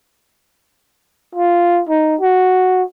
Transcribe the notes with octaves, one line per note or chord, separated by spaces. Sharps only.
F4
D#4
F#4